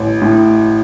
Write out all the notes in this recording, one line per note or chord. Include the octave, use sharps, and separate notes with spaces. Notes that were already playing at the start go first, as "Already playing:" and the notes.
Already playing: A1
A2